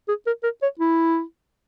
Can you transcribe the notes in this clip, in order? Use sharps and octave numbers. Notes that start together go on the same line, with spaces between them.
G#4
A#4
A#4
C#5
E4